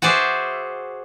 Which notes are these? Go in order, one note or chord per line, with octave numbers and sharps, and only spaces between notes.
F#4 G#4 C5 D5 E5